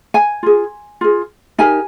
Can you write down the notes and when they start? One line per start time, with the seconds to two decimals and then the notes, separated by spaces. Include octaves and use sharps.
0.14 G#5
0.43 F4 G#4
1.01 F4 G#4
1.58 D#4 G4 A#4 G#5